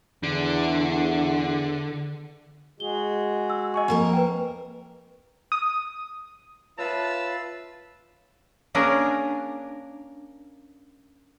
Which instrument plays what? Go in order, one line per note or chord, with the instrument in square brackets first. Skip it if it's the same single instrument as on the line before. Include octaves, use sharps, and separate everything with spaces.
[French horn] E2 [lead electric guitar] D3
[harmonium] G#3 F#4 G#4 [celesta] G7
[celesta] E6
D#5 G#5 C#6
[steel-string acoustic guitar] F2 A#3 A#4
[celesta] B4 G5
[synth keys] D#6
[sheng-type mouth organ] F4 B4 E6 [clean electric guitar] C#5 E5 [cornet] A5
[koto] A#3 C#4 D4 G#4 A#4